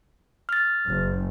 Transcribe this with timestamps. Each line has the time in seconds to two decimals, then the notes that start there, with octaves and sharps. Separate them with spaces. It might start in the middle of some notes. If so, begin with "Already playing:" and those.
0.49 F6 A6
0.88 F#1